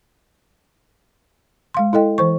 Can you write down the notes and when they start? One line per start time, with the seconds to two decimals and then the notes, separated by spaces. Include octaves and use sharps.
1.74 G#3 F5 C6
1.93 E4 A4 D#5 G5
2.18 E3 C5 C#6